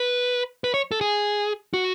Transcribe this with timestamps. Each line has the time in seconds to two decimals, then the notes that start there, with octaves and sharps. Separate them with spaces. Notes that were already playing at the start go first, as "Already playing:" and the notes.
Already playing: B4
0.64 B4
0.74 C#5
0.92 A4
1.01 G#4
1.74 F#4